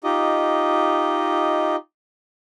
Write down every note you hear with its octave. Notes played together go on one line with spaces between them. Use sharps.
D#4 F4 G4 D#5